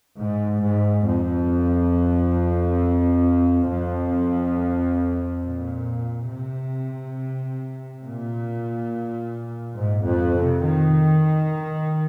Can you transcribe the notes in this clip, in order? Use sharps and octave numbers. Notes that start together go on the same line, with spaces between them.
G#2
G#2
F2
F2
A#2
C3
A#2
G#2
F2
C3
D#3